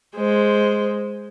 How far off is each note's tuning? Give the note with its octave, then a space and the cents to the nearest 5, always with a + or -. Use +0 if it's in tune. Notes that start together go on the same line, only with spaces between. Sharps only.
G#3 +0 C5 +0